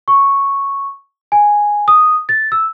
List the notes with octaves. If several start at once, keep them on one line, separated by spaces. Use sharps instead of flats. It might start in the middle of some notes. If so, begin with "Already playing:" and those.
C#6
G#5
D#6
A6
E6